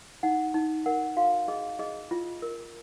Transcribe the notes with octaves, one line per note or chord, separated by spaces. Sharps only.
D#4 F#5
D#4
A#4 F#5
F#4 F5
G#4 D#5
G#4 D#5
F4
A#4